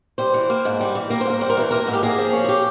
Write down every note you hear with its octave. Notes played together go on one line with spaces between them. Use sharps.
G3 C5
E3
A#3
G#2
G3
E3
A#3 A#4
C5
G#2 A#4
G3 C5
A#4
E3 C5
A#3 A#4
G#2
G4
A#3 G#4
F3
C#4
G#4
G4